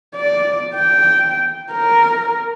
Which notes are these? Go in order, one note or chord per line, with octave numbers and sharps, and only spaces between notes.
D5
G5
A#4